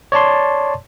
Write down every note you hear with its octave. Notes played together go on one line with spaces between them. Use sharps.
C#5 D5 A5 C6